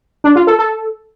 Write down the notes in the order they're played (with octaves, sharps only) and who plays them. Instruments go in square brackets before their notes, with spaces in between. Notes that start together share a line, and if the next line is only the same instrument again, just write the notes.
[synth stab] D4
F4
A4
A4